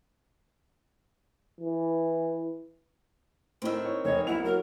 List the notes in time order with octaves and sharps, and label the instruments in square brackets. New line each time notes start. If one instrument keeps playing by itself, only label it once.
[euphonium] E3
[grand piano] A2 E4 E6 [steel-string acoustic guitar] D#3 C4
[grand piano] C#5
[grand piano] F1 D#5 [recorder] C#5
[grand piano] B1 F#5 F7 [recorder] E4
[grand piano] F#3 [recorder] A#4